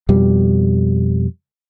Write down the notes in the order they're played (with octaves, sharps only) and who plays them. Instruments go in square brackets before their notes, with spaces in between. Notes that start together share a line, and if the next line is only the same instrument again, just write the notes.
[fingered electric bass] F2 B2 G3